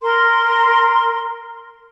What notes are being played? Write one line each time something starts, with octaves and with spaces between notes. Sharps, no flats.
A#4 C6